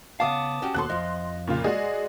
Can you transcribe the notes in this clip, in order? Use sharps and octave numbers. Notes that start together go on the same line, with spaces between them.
C#3 B3 F5 A5 D6 D#6
C#4 F#4 G4
D#2 B2 A4 C6 F#6
F2 F3 D#5
A#2 C#3 F4
G#3 F#4 G#4 D5 D#5